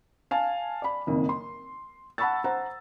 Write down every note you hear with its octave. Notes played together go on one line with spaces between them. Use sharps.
F5 G#5 A5
D5 B5
F#1 F2 D#3
C6
F#5 A5 B5 C#6 E6 A6
C5 F#5 A#5